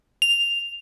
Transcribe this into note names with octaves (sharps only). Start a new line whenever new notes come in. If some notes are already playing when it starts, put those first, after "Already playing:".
F7